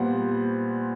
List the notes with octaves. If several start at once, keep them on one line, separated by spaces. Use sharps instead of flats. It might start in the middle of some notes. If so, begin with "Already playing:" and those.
Already playing: A#2 G3 B3 C5 F#5